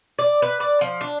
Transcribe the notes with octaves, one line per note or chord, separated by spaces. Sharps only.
D5
B4
D5
F3
D4